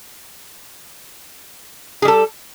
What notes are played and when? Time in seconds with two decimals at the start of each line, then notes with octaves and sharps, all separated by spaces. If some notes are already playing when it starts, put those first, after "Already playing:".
2.02 G#4
2.05 G3
2.08 A4